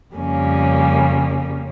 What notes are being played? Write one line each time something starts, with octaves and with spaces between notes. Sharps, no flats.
F2 C#3 G3 A#3 C#4